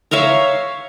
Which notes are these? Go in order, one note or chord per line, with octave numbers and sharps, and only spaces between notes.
C#5 E5 F5 A#5